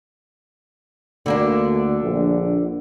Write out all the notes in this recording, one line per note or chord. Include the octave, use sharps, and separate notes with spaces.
D2 D3 A#3 D4
A#1